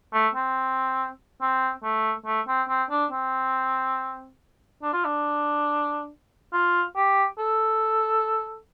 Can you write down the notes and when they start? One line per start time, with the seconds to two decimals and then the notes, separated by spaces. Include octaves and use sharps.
0.13 A3
0.34 C4
1.41 C4
1.83 A3
2.26 A3
2.48 C4
2.69 C4
2.90 D4
3.11 C4
4.82 D4
4.93 F4
5.05 D4
6.53 F4
6.96 G4
7.38 A4